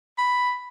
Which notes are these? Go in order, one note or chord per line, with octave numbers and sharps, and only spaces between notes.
B5